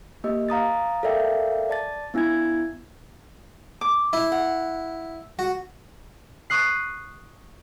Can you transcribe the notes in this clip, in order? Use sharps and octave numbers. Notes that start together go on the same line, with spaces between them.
A#3 G4 D#5
F5 A#5 D#6 A6
A4 A#4 D5 E5 F5 G5
D5 A5 A6
B3 D4 E4 G#5 G#6
D6
E4
F#5
F#4
C#6 D#6 F#6 C7